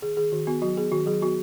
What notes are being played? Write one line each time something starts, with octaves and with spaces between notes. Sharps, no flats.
D#3 G#4
D#3 G#4
D#3 F#4
B3 F#4
F#3 F#4
B3 G#4
D#3 F#4
F#3 G#4
B3 F#4